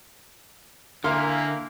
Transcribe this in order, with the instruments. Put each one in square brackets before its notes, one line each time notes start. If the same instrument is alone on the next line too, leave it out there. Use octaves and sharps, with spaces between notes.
[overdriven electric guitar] D3 [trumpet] A#3 [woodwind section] E4 E5 G#5 [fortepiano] A#4 F5 C6